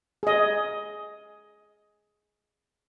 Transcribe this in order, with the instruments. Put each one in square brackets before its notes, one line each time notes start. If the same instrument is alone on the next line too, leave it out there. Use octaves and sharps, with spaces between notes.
[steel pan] G#4 D#5